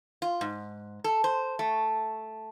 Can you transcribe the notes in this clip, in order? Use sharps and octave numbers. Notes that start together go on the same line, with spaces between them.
F4
G#2
A4
C5
A3